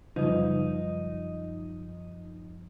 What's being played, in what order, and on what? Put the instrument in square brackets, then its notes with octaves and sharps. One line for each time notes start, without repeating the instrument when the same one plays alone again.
[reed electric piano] F#2 F3 [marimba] C#3 G3 [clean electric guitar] D#4